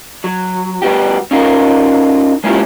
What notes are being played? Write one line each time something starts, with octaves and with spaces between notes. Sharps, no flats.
F#3
G3 B3 F#4 G4
C#4 D#4 F4 F#4 A#4
G#3 A#3 C#4 E4 F4 G4